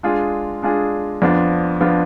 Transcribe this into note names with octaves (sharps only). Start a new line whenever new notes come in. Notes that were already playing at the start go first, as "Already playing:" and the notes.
G#3 D4 F4 G#4
G#3 D4 F4 G#4
F2 F3 B3 D4 F4
F3 B3 D4 F4